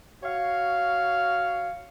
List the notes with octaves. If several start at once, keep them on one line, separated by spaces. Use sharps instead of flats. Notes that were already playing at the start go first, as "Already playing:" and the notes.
F#4 C#5 F5